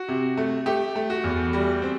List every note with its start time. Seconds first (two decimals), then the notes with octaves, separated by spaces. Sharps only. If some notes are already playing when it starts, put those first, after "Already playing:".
Already playing: F#4
0.08 C3
0.37 A3
0.66 A3 G4
0.95 A3
1.10 F#4
1.24 E2
1.53 G3
1.82 C4